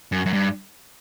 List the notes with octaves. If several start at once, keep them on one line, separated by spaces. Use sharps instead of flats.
F#2
F#2
G2